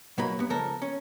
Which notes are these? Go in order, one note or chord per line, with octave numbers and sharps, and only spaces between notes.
B2 F#3 A#3 B5
G2 B3
C#2 F3 A4 A#4
C#4